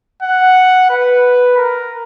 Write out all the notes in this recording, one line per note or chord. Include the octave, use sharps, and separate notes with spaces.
F#5
B4
A#4